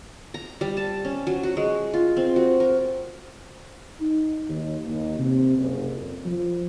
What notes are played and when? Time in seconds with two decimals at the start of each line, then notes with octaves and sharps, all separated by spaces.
0.34 A#5
0.61 G3
0.77 A5
1.05 C#4
1.27 F#3
1.43 F#4
1.57 G#3
1.94 F4
2.17 C4
2.36 F#4
2.60 A#4
4.00 D#4
4.48 D#2
4.85 D#2
5.19 C3
5.58 F#1
5.96 F2
6.25 F3